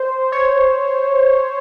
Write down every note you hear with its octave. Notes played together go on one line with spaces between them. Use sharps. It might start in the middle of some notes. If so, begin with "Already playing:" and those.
Already playing: C5
C#5